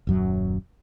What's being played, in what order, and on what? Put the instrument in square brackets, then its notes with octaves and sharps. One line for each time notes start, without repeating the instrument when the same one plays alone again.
[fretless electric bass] D#1 F#2 F#3